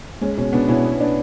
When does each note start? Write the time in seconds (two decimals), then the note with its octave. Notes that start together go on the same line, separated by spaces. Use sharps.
0.21 G#3 C#4
0.37 B2 C#4
0.53 B2 B3 D4
0.69 B2 C#4 E4
0.84 B3
1.00 D4